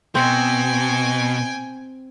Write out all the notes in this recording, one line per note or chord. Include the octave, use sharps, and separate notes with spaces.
B2 C4 G5 G#5